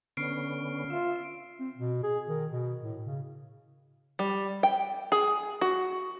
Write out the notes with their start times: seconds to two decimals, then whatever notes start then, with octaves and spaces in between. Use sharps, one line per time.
0.17 D3 B3 C#4 F6 C7 D7
0.90 F4 E5
1.60 C4
1.76 B2
2.03 G#4
2.28 D#3
2.51 B2
2.83 A2
3.04 C#3
4.19 G3
4.63 G5
5.12 G#4
5.61 F#4